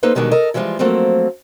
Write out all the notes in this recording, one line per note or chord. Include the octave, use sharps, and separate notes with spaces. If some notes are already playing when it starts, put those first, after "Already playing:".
A#3 D#4 A4 B4 C5
B2 D3 D#3 G3 G#3 F#4
A4 A#4 D#5
E3 F3 G3 G#3 F4
F3 F#3 A3 A#3 C4